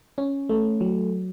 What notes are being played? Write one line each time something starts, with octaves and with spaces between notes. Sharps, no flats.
C#4
A3
F#3